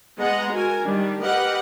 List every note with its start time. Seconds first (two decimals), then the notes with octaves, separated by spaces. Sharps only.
0.18 G#3 B3 D#5 F#5 A#5
0.52 F#4 A#4 G#5
0.83 D#3 G3 D4
1.22 G4 A#4 B4 D#5 F#5